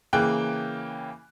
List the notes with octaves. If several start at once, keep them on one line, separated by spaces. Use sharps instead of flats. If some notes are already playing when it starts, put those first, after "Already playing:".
C#3 E3 A#3 G5 F#6